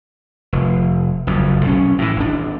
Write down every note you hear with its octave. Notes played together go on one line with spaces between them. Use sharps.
F1
F#1 F2
B1 C#4
A2 E3
G#1 D4